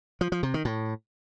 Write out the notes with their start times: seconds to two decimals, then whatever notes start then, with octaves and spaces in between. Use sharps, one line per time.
0.21 F3
0.32 F3
0.43 C3
0.54 D#3
0.65 A2